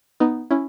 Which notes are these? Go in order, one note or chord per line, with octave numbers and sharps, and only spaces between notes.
B3 D#4
C#4 E4